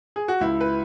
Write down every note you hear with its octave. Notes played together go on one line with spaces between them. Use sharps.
G#4
F#4
C#2 E4
B4